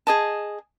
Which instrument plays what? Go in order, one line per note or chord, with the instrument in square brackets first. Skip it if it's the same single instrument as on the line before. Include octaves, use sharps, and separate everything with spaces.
[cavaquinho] G#4 D#5 A5